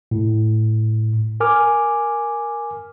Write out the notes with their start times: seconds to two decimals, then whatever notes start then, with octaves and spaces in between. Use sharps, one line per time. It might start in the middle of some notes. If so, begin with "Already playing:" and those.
0.11 A2
1.40 A#4 G#5 D6 F6